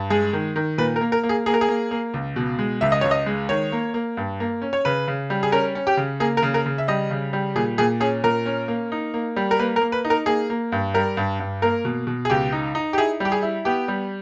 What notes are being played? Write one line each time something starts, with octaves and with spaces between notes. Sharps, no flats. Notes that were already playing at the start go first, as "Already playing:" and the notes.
Already playing: G2
G#3 G#4
D#3
D#3
A#2 B4
A#4
A#3
A#4
A#3
G#4
A#3 G#4
A#4
G#4
A#3
A#3
C#2
B2
G#3
C#2 E5
D#5
C#2 C#5
D#5
G#3
D#3 C#5
A#3
A#3
G2
A#3
C#4
C#5
C#3 B4
C#3
G3
G#4
C#4 A#4
C#4
G4
C#3
A#3 G#4
A#4
C#3
A#4
C#3
E5
G3 D#5
C#3
G3
A#2 G#4
A#2 G#4
C#4 G#4
A#2 A#4
C#4
A#3
D#4
A#3
G3
A#4
A#3 B4
A#4
A#3
B4
D#4
A#4
A#3 G#4
A#3
G2
G3 A#4
G2
G2
A#3 A#4
B2
B2
G#4
C#2 G4
D#4
D#4
G4
E4 G#4
G3 G4
G#4
E4
B3 G4
G3